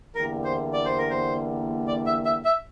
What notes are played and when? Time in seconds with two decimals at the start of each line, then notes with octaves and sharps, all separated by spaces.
0.15 E2 D3 G3 A#3 E4 A#4
0.44 C5
0.73 D5
0.85 C5
0.98 A#4
1.10 C5
1.87 D5
2.06 E5
2.25 E5
2.45 E5